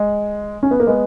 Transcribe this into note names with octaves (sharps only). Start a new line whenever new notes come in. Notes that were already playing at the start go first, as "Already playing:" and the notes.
Already playing: G#3
C#4
B3
A#3
G#3 B3